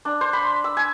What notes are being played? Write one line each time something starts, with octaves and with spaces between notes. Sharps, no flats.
D4
C5
B5
E6
G#5